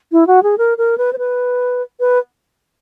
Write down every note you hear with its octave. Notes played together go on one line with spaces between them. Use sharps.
E4
F#4
G#4
A#4
A#4
B4
C5
B4
B4